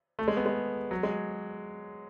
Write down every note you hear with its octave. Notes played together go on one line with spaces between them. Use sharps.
A3
G#3
B3
G#3
F#3
G#3